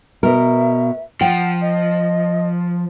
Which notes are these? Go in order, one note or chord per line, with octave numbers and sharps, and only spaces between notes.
B2 A#4 E5
F3 F#5 G5
D#5